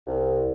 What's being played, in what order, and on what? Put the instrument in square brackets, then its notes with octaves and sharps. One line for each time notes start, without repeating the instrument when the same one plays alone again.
[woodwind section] C2